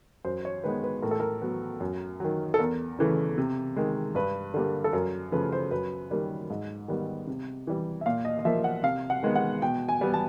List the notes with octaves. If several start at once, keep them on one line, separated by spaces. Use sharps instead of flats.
F#2 C5
C#5
D#3 G#3 B3 B4
B4
A2 A#4
A4
A#4
F#3 B3
F#2
D#3 F#3
A4
E2 A#4
C#3 E3 A3
C3
D#3 G#3
G2 B4
D3 G3 A#3
A4
F#2 A#4
C#3 F3 A3 B4
C5
F#2 B4
D#3 G3 A#3
G#2
D#3 G3 B3
C3
E3 G3
E5
A#2 F5
D#5
D#5
F3 A#3 E5
F#5
C3 F5
F#5
D#3 G#3 B3
F#5
B2 G5
G#5
G3 B3
A5